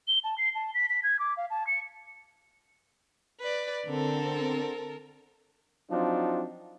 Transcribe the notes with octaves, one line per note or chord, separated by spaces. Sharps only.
G7
A5
C7
A5
B6
B6
G#6
D6
F5
A5
C#7
B4 D5
D3 C4 A4 A#4
F3 F#3 C4 D4 D#4 F4